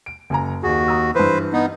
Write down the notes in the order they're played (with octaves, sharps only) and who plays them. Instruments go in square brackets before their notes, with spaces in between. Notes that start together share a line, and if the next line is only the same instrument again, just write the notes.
[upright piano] D7
F#1 G#5 A#5
[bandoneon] D#2 F#4 [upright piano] G#4
[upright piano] A#5 D#6 E6
[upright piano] G2 E3 [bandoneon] B4 C5
[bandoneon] B3 D#4